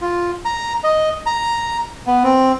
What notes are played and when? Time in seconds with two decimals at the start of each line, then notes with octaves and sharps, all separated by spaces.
0.01 F4
0.45 A#5
0.84 D#5
1.26 A#5
2.07 B3
2.23 C4